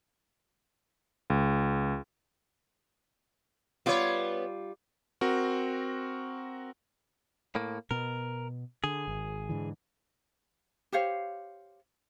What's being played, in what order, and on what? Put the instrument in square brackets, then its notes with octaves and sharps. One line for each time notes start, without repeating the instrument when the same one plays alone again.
[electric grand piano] C#2
[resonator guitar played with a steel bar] G3 F4 [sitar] B3 B4 C#5
[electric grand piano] C4 F#4 A#4
[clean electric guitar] A2 A#3
[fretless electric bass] B2 B3 [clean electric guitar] A#4
[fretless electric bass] D3 [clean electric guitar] G#4
[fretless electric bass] G#1
G#2 D3 E3
[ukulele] G4 C5 C#5 F5